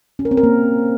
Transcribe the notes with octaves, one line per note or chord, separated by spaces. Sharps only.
C#4
A#4
C4
A#4
A#3